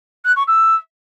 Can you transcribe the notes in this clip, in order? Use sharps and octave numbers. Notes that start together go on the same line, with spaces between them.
F#6
C#6
E6